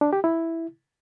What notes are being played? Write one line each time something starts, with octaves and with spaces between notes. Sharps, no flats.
D4
G4
E4